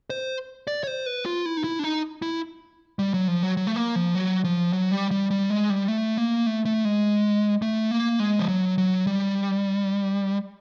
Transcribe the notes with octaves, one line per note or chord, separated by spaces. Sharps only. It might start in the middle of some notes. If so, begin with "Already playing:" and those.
C5
D5
C#5
C5
B4
F4
E4
D#4
E4
D4
D#4
E4
G3
F#3
F3
F#3
F#3
A3
A#3
F3
F#3
F3
F#3
G3
G3
G3
G#3
G3
A3
A#3
A3
A3
G#3
A3
A#3
G#3
F3
F#3
F#3
G3